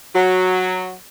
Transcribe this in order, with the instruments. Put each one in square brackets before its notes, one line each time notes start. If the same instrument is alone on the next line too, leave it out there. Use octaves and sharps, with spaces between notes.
[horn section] F#3